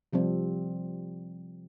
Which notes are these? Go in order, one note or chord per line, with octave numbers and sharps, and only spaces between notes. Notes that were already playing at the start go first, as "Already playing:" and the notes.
C3 F3 G3 C4